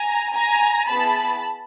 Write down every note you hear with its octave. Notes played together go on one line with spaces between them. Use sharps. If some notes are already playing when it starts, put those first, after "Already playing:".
Already playing: G#5 A#5
G#5 A#5
B3 E4 G#4 A5 B5